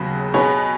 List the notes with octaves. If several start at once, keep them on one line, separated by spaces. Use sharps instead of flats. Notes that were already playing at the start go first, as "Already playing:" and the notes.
Already playing: D#2 C#3 F#3 B3 F#4
B2 B3 G#4 C#5